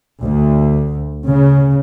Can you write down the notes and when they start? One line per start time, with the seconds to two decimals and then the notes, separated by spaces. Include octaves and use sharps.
0.22 D2
1.29 C#3